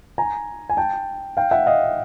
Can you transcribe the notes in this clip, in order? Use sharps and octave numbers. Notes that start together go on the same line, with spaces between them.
G#5 A#5
G#5
G5 A5
F5 G5
E5 F#5
D#5 F5